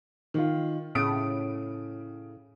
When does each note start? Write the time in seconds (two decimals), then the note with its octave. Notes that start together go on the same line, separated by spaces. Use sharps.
0.34 D#3 F4
0.95 A2 C#3 D#6 D7